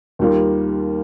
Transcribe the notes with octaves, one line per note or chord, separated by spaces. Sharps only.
D#2 D#3 G3 A#3 F4